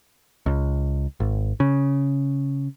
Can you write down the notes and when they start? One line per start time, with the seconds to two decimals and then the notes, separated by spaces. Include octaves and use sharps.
0.46 C#2
1.20 G#1
1.60 C#3